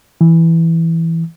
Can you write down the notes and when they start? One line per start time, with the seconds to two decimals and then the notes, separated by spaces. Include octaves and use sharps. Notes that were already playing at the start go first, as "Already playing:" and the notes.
0.21 E3